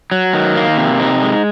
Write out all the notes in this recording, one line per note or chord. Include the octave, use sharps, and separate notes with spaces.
F#3
D#3
A#3
C3
D#4
G#3